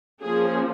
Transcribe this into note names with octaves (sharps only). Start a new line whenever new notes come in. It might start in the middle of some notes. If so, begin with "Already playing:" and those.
F3 A#3 C#4 G#4